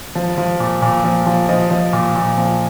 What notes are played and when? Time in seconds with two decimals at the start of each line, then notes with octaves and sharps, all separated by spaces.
0.15 F3
0.38 F3
0.60 A#2
0.82 A#2
1.04 F3
1.27 F3
1.49 F3 D#5
1.71 F3
1.93 A#2
2.15 A#2
2.38 F3